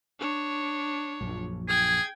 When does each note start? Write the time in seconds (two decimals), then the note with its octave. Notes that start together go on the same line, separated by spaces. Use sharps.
0.20 D4 C#5
1.21 A#1 F#2 F3
1.68 G#4 G5 G#6